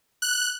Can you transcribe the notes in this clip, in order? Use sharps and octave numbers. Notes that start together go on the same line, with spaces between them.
F#6